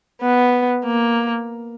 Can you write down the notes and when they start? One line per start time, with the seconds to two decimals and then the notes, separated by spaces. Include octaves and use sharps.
0.22 B3
0.85 A#3